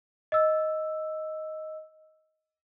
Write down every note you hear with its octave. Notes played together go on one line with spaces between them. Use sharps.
D#5 E6